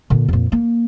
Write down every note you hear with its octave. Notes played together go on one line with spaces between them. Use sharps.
A#2 D3
F2 A#2
A#3